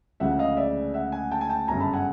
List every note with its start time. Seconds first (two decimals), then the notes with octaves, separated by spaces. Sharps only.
0.20 D2 C#3 F3 G#3 E5 F#5
0.39 D#5 F5
0.57 D5 E5
0.94 E5 F#5
1.12 F#5 G#5
1.31 G5 A5
1.41 G#5
1.49 G5 A5
1.68 G1 F#2 C#3 G#5 A#5
1.80 A5 B5
1.93 F#5 G#5